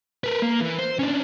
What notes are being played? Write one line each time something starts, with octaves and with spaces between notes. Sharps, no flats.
A#4 B4
A#3
E3
C5
C#4 D4